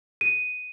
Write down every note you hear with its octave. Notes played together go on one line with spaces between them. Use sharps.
D#7